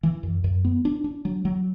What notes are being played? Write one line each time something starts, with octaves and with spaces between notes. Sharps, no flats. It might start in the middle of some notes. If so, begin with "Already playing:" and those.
E3
F#2
F#2
B3
D4
D4
F#3
F#3